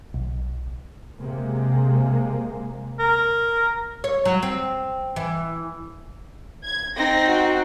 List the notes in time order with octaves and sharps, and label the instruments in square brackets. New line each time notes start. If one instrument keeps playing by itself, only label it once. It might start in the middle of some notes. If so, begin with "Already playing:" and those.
[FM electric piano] B1
[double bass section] C3 G#3 A#3
[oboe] A#4
[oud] C#5
F#3
C4
E3
[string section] G#6
[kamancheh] C4 D#4 [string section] A#6
[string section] F#4